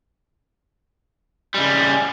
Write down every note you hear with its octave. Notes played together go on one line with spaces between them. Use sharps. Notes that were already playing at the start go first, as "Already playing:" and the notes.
C#3 G3